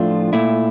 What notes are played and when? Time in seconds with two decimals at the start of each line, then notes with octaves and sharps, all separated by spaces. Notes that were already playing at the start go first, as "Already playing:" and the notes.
Already playing: A2 F3 A3 D4 F4
0.33 A#2 A3 E4